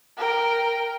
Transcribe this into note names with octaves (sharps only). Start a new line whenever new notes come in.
A#4 G5